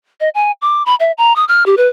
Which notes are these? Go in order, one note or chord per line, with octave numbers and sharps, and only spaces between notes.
D#5
G#5
D6
B5
E5
A#5
D#6
F6
G4
B4